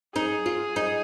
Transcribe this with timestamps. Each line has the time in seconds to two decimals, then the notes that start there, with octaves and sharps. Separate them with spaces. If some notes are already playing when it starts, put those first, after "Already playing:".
0.15 D#4 G#4
0.46 F4
0.76 D#4